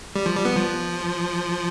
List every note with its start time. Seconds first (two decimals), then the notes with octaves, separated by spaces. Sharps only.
0.16 G3
0.26 F3
0.36 G3
0.45 B3
0.56 F3